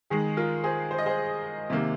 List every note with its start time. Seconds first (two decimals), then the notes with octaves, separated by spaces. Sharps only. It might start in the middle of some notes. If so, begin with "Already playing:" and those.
0.10 D#3 G#3 G#4
0.37 F4 A#4
0.63 G#4 C5
0.91 C5
0.98 D#5
1.06 G#4 C5
1.70 C3 D#3 A#3